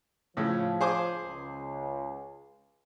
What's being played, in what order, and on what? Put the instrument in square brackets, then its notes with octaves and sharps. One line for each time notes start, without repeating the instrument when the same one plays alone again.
[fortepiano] A2 C#3 [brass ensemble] F3
[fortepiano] G#4 C5 D6
[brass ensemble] C#2